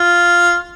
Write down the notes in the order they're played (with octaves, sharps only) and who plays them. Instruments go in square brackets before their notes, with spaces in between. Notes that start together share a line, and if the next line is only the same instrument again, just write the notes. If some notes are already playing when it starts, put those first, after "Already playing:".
Already playing: [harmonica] F4